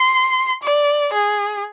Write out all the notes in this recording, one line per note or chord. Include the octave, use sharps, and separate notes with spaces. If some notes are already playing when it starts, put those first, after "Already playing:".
Already playing: C6
D5
G#4